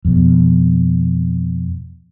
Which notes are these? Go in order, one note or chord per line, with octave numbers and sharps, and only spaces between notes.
F2 B2